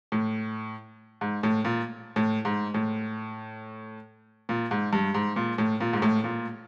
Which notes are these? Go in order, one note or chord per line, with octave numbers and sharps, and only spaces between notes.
A2
G#2
A2
A#2
A2
G#2
A2
A#2
G#2
G2
G#2
A#2
A2
A#2
G#2
A2
A#2